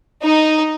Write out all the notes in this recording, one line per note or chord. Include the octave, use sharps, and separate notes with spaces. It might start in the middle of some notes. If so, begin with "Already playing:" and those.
D#4